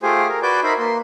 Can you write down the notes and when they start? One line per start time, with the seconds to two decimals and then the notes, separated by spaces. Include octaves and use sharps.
0.03 A3 F4 G4 G#4 C5 G#5
0.29 A#4
0.43 F#4 B4 D5 G#5 D6 G6
0.64 D#4 A#4 C5 E5 B5
0.79 A#3 C6